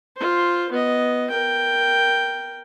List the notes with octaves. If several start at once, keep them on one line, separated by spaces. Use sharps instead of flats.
F4 C5
B3 D#5
A#4 G5